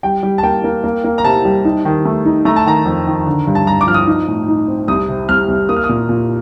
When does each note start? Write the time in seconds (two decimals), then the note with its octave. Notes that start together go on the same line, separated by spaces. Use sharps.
0.03 G3 G5
0.23 G3
0.38 A5
0.43 A#3 G5
0.64 A#3
0.84 A#3
1.04 A#3
1.18 A#5
1.24 C3 A5
1.45 G3
1.65 D#4
1.85 D#3
2.05 A3
2.25 D#4
2.45 A3 A#5
2.56 A5
2.66 D#3 A#5
2.86 F2
3.07 D#3
3.26 D3
3.47 G2
3.55 A5
3.67 G2 A#5
3.81 D6
3.87 F3 F6
3.94 D#6
4.07 D#4
4.28 A2
4.48 D#4
4.68 C4
4.88 C2 D#6
5.09 C3
5.29 C2 F6
5.48 C2
5.69 A#3 D#6
5.76 F6
5.84 D#6
5.89 A#2
6.09 A#2